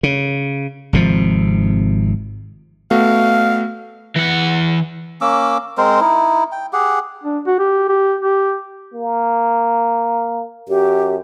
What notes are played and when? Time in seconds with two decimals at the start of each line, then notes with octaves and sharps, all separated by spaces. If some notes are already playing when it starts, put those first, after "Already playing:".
0.03 C#3
0.93 G#1 C3 F3
2.91 A3 B3 F#4 F5
4.16 E3 F#5
5.21 A#3 C#4 D6 E6
5.78 G#3 C4 A#4 C5
6.01 D#4 E4
6.52 G5
6.73 G4 G#4 F#5
7.23 D4
7.47 F#4
7.59 G4
7.89 G4
8.20 G4
8.94 A#3
10.69 F#2 G4